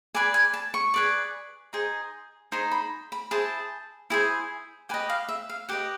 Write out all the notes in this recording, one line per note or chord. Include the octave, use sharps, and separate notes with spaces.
G#4 B4 D5 G#5
G#5
A5
C#6
G#4 B4 D5
D#4 G#4 C5
D#4 G#4 C5 C6
B5
B5
E4 G#4 C5 A5
E4 G#4 C5
G4 B4 D#5 G#5
F5
E5
F5
G4 B4 D#5 F#5